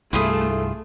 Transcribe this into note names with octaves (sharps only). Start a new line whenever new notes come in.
C2 G2 A3 E4 F4 G#4